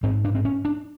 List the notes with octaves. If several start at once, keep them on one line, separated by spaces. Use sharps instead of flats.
G#2 C4
D4
C4
C#4
D4